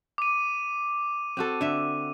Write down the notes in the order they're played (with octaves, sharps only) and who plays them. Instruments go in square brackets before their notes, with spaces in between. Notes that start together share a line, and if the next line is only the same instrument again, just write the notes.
[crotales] D6 D#7
[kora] C4 F#4 A4
D3 E5